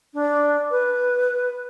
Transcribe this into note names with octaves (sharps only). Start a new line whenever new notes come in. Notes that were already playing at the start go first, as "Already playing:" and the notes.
D4
B4